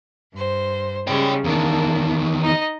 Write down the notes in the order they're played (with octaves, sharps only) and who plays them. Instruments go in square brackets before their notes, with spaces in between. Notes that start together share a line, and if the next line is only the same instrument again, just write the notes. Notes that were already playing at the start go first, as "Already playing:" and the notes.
[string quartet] G2 C5
[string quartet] C#3 G3 G#3 [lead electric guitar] C#5 G5
[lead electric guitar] E2 D#3 [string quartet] A#3 D4
[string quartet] D#4 D#5